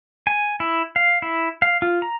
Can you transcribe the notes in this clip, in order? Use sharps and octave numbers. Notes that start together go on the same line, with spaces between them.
G#5
E4
F5
E4
F5
F4
A#5